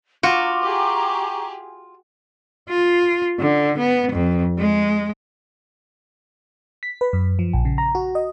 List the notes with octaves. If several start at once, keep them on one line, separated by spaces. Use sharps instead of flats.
F4 F#4 A#5 C#6 D6
G4 G#4
F4
D3
B3
F2
G#3
B6
B4
F#2
F3
A#1
C#3
A#5
F#4
D#5